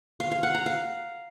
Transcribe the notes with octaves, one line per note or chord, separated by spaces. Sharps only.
F5
F5
F#5
A#5
F5